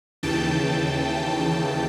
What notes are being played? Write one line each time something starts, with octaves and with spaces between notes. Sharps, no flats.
D#2 C#3 E3 G5 A5